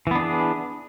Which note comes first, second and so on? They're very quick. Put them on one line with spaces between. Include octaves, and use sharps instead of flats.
E3 B3 D4 G#4